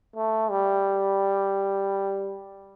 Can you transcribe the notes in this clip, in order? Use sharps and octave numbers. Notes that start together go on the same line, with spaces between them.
A3
G3